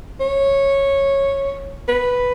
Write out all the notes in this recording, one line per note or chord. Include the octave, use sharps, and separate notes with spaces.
C#5
B4